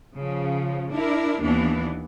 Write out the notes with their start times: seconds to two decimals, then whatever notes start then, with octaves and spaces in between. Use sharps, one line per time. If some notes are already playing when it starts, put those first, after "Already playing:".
0.17 C#3 F3
0.91 D4 E4 A#4
1.41 D#2 E3 B3 D4